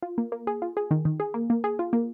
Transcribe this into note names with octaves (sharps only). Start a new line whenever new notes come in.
F4
A#3
A#3
G#4
F4
G#4
D#3
D#3
G#4
A#3
A#3
G#4
F4
A#3